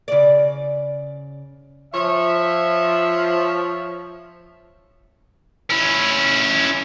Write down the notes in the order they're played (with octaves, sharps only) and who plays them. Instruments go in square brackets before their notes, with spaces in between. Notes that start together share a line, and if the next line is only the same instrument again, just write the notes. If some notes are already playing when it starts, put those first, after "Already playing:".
[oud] C#3 D5
[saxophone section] F3 [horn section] C#5 E5
[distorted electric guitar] C#4 E4